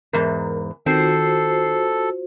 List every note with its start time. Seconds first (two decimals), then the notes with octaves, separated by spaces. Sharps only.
0.13 E2 G#2 A#4
0.86 D#3 C4 F4 F#4 A4 C5 C7